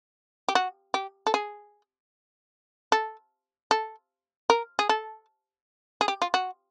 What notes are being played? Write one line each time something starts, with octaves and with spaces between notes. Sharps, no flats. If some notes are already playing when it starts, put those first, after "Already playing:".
G4
F#4
G4
A4
G#4
A4
A4
A#4
G#4
A4
G#4
G4
F4
F#4